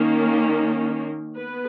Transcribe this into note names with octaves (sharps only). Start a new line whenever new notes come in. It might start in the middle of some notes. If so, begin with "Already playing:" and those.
Already playing: D#3 A#3 C#4
B3 B4